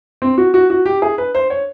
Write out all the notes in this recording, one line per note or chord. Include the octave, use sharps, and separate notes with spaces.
C4
F#4
F#4
F#4
G4
G#4
B4
C5
C#5